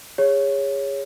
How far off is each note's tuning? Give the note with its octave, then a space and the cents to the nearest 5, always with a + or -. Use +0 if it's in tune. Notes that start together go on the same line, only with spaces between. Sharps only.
G#4 -25 C#5 +0